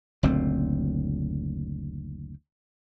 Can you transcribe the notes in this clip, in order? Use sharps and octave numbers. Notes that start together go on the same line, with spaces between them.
F#1 D2 A#2 C4